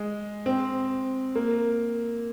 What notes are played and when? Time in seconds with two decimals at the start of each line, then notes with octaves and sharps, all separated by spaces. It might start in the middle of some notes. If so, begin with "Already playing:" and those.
Already playing: G#3
0.46 C4
1.35 A#3